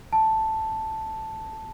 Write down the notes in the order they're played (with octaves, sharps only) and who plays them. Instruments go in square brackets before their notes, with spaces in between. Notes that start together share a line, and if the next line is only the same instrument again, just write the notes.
[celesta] A5